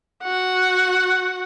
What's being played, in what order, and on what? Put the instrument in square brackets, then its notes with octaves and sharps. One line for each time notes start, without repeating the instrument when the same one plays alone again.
[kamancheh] F#4 F#5